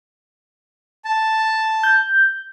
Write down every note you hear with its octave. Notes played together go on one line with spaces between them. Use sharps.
A5
G6